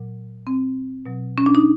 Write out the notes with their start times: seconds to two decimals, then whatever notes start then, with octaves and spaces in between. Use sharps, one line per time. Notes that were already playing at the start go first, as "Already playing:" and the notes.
Already playing: A#2 F#3
0.47 C4
1.06 B2 F#3
1.38 C#4
1.46 D4
1.55 D#4